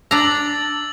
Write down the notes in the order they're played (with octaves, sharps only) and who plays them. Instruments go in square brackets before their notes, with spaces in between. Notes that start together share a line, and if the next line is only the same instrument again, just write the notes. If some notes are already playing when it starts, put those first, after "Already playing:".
[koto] D4 A#5 [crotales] E6 A6 F#7